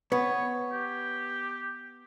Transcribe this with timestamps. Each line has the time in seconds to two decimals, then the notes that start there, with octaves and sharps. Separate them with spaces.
0.12 B3 C#5
0.72 G4